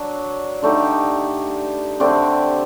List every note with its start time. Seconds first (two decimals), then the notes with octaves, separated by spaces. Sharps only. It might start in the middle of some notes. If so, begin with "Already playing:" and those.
Already playing: F#3 D4
0.62 D3 A3 D#4 G4
2.00 D3 A3 C4 G4